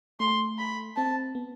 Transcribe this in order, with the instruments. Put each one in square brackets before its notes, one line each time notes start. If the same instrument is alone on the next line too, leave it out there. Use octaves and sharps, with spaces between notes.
[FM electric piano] A3 [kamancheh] C6
[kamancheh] B5
[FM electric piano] C4 [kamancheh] A5
[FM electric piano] B3